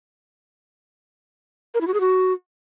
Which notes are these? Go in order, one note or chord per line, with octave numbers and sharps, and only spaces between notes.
A#4
E4
F#4
G#4
F#4